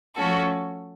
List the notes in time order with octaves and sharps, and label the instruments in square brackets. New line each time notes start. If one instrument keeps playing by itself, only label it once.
[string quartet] F3 A3 C#4 F#4 A4